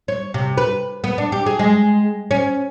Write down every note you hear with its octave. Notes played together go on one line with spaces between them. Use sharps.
C#5
C3
B4
B3
D4
G4
G#4
G#3
C#4